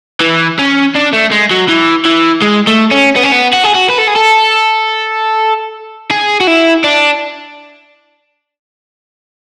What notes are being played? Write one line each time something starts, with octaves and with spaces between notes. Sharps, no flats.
E3
C#4
D4
A3
G#3
F#3
E3
E3
G#3
A3
C#4
B3
C#4
B3
F#4
G#4
F#4
B4
A4
G#4
A4
G#4
F#4
E4
D4